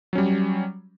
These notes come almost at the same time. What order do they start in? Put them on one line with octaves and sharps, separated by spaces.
F#3 C#4 G3